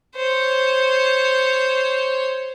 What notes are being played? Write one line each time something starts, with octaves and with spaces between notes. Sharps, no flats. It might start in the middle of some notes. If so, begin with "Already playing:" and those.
C5 C#5